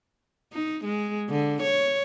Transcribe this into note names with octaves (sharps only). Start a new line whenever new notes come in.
D#4
G#3
D3
C#5